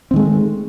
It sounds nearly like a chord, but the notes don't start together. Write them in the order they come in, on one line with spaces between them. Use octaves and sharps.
C4 D#3 G#3 A3